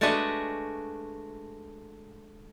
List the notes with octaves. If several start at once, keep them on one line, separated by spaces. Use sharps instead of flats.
G#3 A3 D4 F#4 B4 D#5